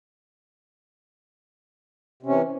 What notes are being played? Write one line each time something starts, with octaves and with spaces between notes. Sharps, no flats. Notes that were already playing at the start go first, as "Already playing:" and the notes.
C3 E3 C#4